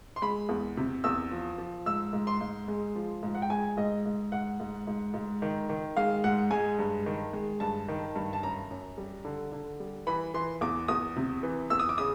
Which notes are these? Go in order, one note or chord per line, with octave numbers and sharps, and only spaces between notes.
C6
G#3 B5
E2
C3
E2 E6
F3
F3
G#2 E6
G#2
C6
G#2
G#3
F3
G#2
F#5
G5
G#3 G#5
G#2 D#5
G#2
G#2 F#5
G#2
G#2
G#2
D#3
D#3
G#3 F5
G#2 F#5
G#3 G#5
G2
D#3
G#3
G2 A5
D#3
G2
A5
F#2 A#5
F#2
G3
D3
D3
G3
E3 B5
E3 C6
E2 D6
E2 D#6
C3
E3
E2 E6
D#6
D6
C#3 D#6